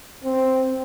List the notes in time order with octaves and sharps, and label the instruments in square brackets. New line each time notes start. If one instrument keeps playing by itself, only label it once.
[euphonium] C4